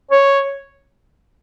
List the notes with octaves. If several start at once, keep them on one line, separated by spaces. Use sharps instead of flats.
C#5